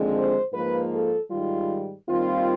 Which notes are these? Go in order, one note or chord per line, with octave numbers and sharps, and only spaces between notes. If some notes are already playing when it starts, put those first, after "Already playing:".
Already playing: D#2 D3 F3 G#3 C4
C5
G#2 F3 A#3 B4
A4
G#2 D#3 G3 F4
D#2 D#3 G3 C4 F4